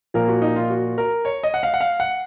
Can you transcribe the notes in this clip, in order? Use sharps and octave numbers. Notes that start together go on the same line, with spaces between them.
A#2 F3 A#3 A#4
F#4
D#4
F4
F#4
A#4
C#5
D#5
F#5
F5
F#5
F5
F#5